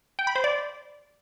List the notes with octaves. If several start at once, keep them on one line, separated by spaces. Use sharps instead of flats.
G5
B5
C5
D5